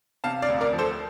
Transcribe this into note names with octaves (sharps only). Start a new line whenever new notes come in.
C3 F5 A5
D5 F5
D2
A#4 D5
F3
A4 C5